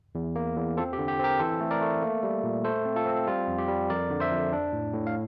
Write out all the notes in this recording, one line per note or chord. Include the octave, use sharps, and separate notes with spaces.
E2
A#3
E2
C4 F4 A4
G4
D3
G4
C4 G4 A#4
E3 A4 C5
A3
A#4 D5
A3
A#3
G3
A#2
A3 A4 C5
C4
F4 A4
C4
G3 F4
F2
G4
G3
F2 A#4 D5
D3
C5 E5
F2
D4
A2
A2
F5